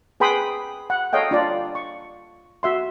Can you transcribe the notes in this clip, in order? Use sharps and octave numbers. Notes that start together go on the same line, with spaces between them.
G#4 B4 G5 B5 C6 D#6
F#5
A4 C#5 D#5 F5 G5
D4 F4 D5
C#6
F#4 E5 C6